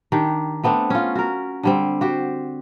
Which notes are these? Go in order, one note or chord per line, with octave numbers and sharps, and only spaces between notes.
D#3 D4 G4
A3 B3 C4 D4
C#4 F4
F#4 A#4
D3 G3 C4
F#4 G4 C5